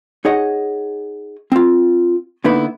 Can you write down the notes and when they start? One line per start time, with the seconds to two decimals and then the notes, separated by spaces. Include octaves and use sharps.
0.25 D#4 G#4 C#5 D#5 F#5
1.52 C4 F4
2.44 D3 A#3 B3 D#4 E4 B4